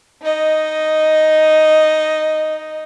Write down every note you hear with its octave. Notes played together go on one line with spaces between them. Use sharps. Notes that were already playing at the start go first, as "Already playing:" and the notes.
D#4 D#5